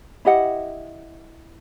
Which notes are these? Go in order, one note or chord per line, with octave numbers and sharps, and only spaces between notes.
E4 G4 D#5 F#5